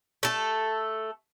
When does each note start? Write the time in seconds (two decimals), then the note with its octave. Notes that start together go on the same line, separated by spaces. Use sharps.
0.23 A3 A4